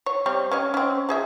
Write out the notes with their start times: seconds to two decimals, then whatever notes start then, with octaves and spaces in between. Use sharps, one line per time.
0.06 C#5
0.26 G3 C4 C#5
0.51 C#4 C#5 D#5
0.74 C4 C#4
1.09 F3 G#4 E5